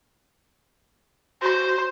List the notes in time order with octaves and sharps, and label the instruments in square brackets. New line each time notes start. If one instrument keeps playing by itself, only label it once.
[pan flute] F#4 [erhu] C5